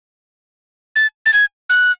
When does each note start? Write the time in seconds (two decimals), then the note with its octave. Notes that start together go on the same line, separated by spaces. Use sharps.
0.96 A6
1.26 A6
1.33 G#6
1.69 F#6